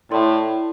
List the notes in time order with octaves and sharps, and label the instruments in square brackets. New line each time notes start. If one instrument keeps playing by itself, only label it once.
[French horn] A2 [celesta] E4 A4 D5 C6